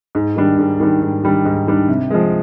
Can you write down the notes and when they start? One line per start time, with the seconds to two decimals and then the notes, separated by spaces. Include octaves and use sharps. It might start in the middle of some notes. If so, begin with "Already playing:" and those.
0.15 G#2
0.36 D#3 G3 D4
0.58 G#2
0.80 D#3 G3 D4
1.02 G#2
1.24 D#3 G3 D4
1.45 G#2
1.67 D#3 G3 D4
1.89 C3
2.10 F3 G#3